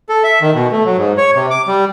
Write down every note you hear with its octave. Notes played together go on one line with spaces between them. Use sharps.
A4
E5
D#3
B2
A3
F#3
G#2
C#5
C3
D6
G3